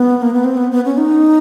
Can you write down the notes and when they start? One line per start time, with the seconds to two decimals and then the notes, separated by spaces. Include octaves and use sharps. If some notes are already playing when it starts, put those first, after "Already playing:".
Already playing: B3
0.22 A#3
0.33 B3
0.44 C4
0.57 B3
0.71 B3
0.85 C#4
0.98 D#4